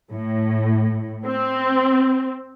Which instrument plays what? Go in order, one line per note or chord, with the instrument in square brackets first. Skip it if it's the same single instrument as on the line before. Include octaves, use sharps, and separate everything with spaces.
[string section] A2
C4